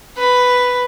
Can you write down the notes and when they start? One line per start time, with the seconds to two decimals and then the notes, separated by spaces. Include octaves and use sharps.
0.17 B4